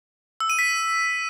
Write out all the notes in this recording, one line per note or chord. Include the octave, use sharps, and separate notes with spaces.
E6
D#7
B6